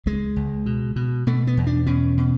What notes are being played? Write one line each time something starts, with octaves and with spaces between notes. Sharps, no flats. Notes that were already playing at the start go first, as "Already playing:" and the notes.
C#2 G#3
C#2
B2
B2
B2 A3
B3
E2
D4
B2 C#4
B2